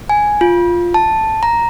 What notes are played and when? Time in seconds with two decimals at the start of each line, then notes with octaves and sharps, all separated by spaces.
0.09 G#5
0.41 F4
0.94 A5
1.43 A#5